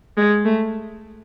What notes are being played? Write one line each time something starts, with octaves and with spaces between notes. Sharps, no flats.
G#3
A3